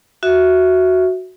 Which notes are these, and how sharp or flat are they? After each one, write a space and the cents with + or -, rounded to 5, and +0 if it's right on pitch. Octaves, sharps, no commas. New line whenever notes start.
F#4 +0 E5 +0